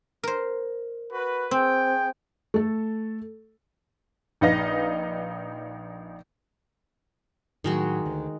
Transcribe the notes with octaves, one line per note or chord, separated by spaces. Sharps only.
A#4 C5
F#4 B4
C4 G#4 G5
A3 A4
A#1 D#4 B4 D#5 F5 A#6
A2 D#3 F#3 G#3 F#4
D2 D3